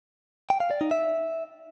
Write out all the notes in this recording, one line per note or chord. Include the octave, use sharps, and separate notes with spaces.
G5
F5
D5
D#4
E5